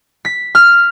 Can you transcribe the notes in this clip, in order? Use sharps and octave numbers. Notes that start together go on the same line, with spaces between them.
B6
F6